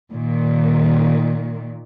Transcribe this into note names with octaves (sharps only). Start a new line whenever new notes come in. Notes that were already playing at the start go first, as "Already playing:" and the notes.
A#2 D#3